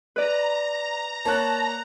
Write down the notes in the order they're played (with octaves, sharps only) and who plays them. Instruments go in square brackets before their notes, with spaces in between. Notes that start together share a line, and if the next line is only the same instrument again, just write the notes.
[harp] B4 D5 [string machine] A#5
[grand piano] A#3 C#5 F#6 [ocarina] A5